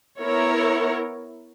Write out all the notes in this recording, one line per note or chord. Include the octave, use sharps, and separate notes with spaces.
B3 E4 A#4 C#5